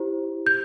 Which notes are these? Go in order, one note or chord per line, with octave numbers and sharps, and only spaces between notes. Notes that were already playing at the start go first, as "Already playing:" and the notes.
Already playing: E4 G4 C5
G6